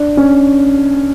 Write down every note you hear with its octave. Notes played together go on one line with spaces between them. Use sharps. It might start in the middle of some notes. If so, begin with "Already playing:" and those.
Already playing: D4
C#4